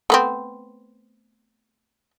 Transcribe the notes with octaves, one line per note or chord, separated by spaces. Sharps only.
A3 B3 C4